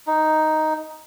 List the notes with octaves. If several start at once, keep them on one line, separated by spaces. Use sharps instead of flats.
D#4